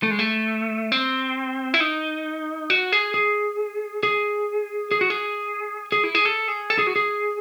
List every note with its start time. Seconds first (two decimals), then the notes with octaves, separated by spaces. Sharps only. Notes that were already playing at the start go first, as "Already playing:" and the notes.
0.03 A3
0.11 G#3
0.19 A3
0.92 C4
1.74 E4
1.80 D#4
2.70 F#4
2.92 G#4
3.14 G#4
4.03 G#4
4.91 G#4
5.01 F#4
5.10 G#4
5.92 G#4
6.04 E4
6.15 G#4
6.25 A4
6.48 G#4
6.70 A4
6.79 G#4
6.87 F#4
6.96 G#4